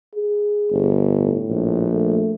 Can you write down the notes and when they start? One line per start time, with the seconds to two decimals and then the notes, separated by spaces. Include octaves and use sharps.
0.15 G#4
0.72 G1
1.09 A2
1.49 A#1
1.90 A3